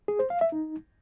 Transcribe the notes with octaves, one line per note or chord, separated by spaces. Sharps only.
G#4
C5
F5
E5
D#4